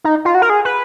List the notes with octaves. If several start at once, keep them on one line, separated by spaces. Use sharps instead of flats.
D#4
F4
F#4
A#4
G#4
B4